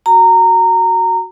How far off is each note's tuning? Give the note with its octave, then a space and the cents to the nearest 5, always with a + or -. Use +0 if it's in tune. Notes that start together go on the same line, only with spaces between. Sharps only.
F#4 +0 A#5 -20